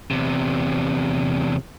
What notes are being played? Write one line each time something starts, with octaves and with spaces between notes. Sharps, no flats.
E2 C3